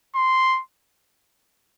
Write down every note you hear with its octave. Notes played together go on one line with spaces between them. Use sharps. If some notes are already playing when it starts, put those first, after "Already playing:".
C6